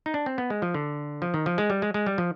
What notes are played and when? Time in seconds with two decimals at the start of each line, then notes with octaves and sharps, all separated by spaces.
0.06 D#4
0.14 D4
0.26 C4
0.38 B3
0.50 G#3
0.62 F3
0.74 D3
1.22 F3
1.34 D#3
1.46 F3
1.58 G#3
1.70 G3
1.82 G#3
1.94 G#3
2.06 G3
2.18 F3